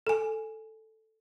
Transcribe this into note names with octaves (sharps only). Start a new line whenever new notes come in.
A4 G#5